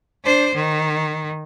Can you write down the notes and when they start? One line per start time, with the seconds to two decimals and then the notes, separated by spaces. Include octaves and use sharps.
0.24 D4 C5
0.55 D#3